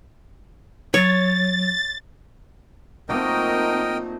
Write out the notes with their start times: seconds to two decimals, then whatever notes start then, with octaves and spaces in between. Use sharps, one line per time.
0.94 F#3 C#5 A6
3.09 A#2 F#3 A3 C4 D#4 A#4 D#5 G5